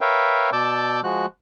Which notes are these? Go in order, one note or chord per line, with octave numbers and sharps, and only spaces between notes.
A#4 B4 C#5 E5 F5 G5
B2 D5 A5 D6 E6 G6
F3 G#3 F#4 F#6